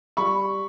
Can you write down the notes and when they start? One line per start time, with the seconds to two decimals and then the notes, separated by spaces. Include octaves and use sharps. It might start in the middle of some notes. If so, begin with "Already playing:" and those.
0.17 G3 B5 C#6